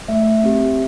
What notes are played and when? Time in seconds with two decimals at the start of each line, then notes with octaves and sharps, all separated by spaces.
0.08 A3 E5
0.44 C4 G4